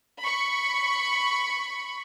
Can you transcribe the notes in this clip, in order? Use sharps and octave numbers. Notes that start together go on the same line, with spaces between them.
B5 C#6